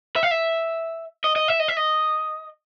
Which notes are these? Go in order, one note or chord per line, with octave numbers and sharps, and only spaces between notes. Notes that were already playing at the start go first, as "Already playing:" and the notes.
E5
F5
E5
D#5
D#5
E5
D#5
E5
D#5